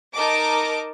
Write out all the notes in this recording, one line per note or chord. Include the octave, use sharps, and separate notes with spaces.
D#4 A#4 D#5 A5 D6 D7